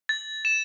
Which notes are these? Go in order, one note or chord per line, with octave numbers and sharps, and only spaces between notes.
A6
E7